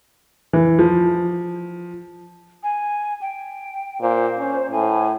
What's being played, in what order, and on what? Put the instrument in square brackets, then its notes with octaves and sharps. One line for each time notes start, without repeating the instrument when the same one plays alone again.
[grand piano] E3
F3
[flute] G#5
G5
[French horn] A#2 [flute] C5
[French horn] C#4
[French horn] A2 [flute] G#5